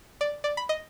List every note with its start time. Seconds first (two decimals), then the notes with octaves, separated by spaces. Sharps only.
0.21 D5
0.44 D5
0.57 B5
0.69 D#5